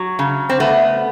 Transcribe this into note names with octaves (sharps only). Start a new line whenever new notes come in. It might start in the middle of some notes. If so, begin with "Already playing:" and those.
Already playing: F#3
C#3
C4
A3 B3